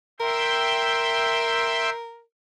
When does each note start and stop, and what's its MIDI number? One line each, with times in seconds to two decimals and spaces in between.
0.20 2.21 70
0.20 1.90 76
0.20 1.90 79
0.20 1.90 84